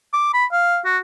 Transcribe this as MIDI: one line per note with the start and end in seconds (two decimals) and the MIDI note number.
0.13 0.32 86
0.34 0.45 83
0.52 0.79 77
0.85 0.98 66